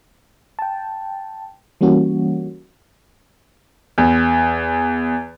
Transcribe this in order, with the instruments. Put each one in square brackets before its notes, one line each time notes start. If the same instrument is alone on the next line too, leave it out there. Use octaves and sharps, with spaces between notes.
[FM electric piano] G5 A5
E3 G3 A#3 C#4 F#4
[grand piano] E2